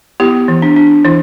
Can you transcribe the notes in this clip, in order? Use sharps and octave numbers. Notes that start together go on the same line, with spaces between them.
B3 E4 G4
E3
D4
D4
E3 E4